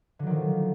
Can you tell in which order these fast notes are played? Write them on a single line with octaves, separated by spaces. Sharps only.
D3 F#3 D#3 F3